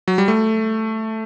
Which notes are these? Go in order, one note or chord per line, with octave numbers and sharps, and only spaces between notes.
F#3
G3
A3